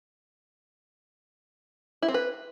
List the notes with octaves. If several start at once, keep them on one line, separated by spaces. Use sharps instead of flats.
E4
C4
B4